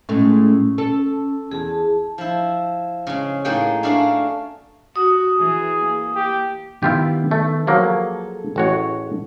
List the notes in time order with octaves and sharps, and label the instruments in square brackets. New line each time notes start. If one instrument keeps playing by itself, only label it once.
[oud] A2 G#3 A3 [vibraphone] C#4
[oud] A4
[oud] E2 [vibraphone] G#4 A5
[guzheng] F3 E4
C#3 G#3
A2 A#3 D#4 G#4 F#5 G5
A3 D4 F#4 G#4 A#4 F5
[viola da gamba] F#4 [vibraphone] D#6
[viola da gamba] E3 [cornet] G#4
[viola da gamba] A#3
[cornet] G4
[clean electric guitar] D#3 B3 [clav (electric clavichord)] E4 F4 G4
[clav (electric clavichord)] A3
[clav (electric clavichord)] F3 F#3 A#3 [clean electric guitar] G#4 A4
[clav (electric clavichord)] A1 F#4 C#5